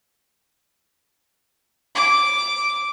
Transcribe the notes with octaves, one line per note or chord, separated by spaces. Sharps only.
D6